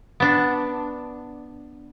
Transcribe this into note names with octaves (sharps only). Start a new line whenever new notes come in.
B3 D4